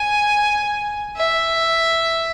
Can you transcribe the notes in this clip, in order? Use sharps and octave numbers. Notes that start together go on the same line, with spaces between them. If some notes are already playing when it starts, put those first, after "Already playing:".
Already playing: G#5
E5